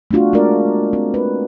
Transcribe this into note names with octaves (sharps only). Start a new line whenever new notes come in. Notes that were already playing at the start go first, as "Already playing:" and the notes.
A3 B3 D4 F4 F#4
G#3 A#3 D4 F#4 A#4 D5
C4
B4